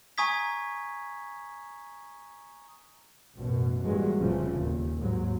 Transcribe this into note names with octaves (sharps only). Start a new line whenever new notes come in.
G#5 A#5 C#6 D#6 G#6 B6
A1 F#2 B2
G2 A#2 E3 F#3 G#3
F1 A#2 C#3 E3 F3
D#2 A#2
D#2 G#2 F#3